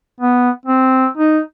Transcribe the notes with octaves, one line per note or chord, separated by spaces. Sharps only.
B3
C4
D#4